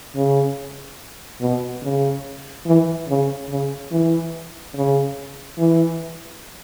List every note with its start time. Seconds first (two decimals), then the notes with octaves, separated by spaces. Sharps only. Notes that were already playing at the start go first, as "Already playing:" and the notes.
0.16 C#3
1.41 B2
1.83 C#3
2.66 E3
3.08 C#3
3.49 C#3
3.91 E3
4.74 C#3
5.58 E3